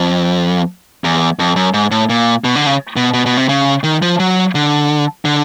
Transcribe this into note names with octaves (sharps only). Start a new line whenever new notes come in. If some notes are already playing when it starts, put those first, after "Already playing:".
Already playing: F2
E2
F2
F#2
G#2
A2
A#2
B2
D3
C#3
B2
B2
B2
C3
C#3
D#3
F3
F#3
D3
D3